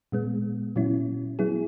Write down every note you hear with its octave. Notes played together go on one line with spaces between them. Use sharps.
A#2 G#3 B3
A#2 F#3 C#4 E4
F#3 B3 E4 G#4